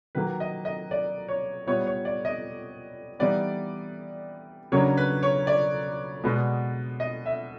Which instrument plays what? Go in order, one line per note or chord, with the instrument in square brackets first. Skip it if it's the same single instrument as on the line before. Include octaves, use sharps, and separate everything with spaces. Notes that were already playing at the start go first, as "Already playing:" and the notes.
[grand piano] D#3 F#3 A#3 B4
D#5
D#5
D5
C#5
A#2 G3 B3 E4 C#5
C#5
D5
D#5
E3 G3 B3 D#4 D5
C#3 F#3 A#3 D4 C#5
B4
C#5
D5
B2 G#3 B3
D#5
E5